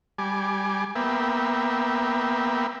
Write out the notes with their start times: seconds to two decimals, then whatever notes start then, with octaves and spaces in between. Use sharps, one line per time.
0.18 G3 G#5 D6
0.95 A#3 B3 E5 G5